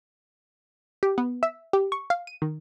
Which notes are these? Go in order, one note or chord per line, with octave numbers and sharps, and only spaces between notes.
G4
B3
E5
G4
C#6
F5
D#7
D#3